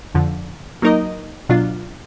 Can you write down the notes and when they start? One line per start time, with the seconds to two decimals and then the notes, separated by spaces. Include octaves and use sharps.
0.15 F2 D3 F3
0.82 F#3 A#3 D#4 A#4 D#5
1.49 B2 F#3 D4 F4